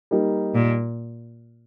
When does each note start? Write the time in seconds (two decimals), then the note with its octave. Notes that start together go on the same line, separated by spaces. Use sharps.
0.11 G3 A#3 D#4
0.55 A#2